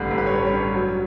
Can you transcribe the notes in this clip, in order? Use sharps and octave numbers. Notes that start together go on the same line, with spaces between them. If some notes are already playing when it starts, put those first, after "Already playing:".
Already playing: A1 G2 D3 G3 A4 B4
A1
B4
C#5
G3 B4
C#5
G2
F#3